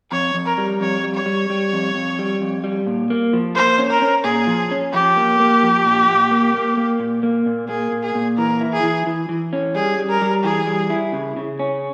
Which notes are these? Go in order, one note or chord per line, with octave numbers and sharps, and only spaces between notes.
F2 C#5
F2
A#4
G3
F2 C#5
G3
C#5
G3
G3
F2
F2
G3
F2
G3
A#2
A#3
F3
A#3 C5
C#4
A#4
C#4
A#2 G#4
F3
C#4
F3 G4
A#3
A#3
F3
A#2
A#2
A#3
A#3
A#3
A#2
A#3
A#2
A#3 G#4
A#2
G#4
A#2
E3 A#4
E4
G#4
E3
E3
E3
C#4
G3 G#4
G3
A#4
G3
E3 G#4
G3
E4
C#3
C#3
C#4